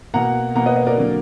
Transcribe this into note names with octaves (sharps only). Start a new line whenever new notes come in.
B2 A#3 F#5 A#5
B2 A#3 F#5 A#5
B4 D#5
B4 D#5
A#4 D5
D3 F#3 A#3